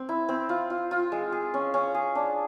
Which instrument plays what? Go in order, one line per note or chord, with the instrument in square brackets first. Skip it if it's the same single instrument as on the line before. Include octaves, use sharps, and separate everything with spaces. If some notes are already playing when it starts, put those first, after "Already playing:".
Already playing: [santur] C4
E4
C4
F4
F4
F4
G#3
G#4
C#4
C#4
G#4
D4